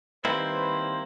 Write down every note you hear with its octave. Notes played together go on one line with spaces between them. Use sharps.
D#3 G3 A#3 C4 E4 B4 C5